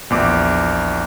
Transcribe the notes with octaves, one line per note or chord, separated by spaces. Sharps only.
A#1 E2 D6